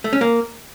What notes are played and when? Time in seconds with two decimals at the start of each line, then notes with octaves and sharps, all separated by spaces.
0.04 A3
0.13 C#4
0.21 A#3